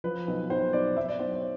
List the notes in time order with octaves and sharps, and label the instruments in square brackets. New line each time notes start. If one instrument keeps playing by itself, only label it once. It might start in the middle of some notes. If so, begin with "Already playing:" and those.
[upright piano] F3 B4
B1
B1 C5
B1 D5
B1 E5
D5
B1 C5
C#5